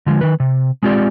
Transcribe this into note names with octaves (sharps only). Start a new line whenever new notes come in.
D3 F3 G#3
D#3 B4
C3
G#3 C4 F4 G4 D5